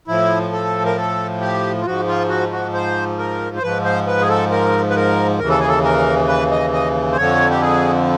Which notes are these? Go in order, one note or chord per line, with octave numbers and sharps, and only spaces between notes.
A2 F3 E4
A4
A#4
A4
G4
F4
G#2 F3 F#4
F4
F#4
F#4
C5
A#4
C5
G#2 F3 B4
C5
B4
G#4
A4
A#4
B4
A#4
D#2 C#3 E3 A#4
A4
G#4
A4
A#4
B4
D#5
D#5
C5
F2 D3 F3 C#5
G4
G#4